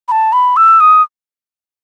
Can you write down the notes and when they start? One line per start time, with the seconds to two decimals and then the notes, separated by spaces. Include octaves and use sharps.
0.08 B5
0.12 A5
0.33 B5
0.57 E6
0.80 D#6